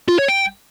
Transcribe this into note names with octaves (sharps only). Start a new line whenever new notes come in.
F4
C#5
G5